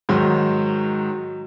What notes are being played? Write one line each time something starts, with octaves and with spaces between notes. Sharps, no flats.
G#2 D#3 F#3